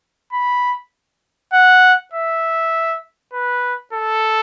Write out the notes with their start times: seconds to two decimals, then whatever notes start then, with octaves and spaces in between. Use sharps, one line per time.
0.33 B5
1.53 F#5
2.13 E5
3.33 B4
3.93 A4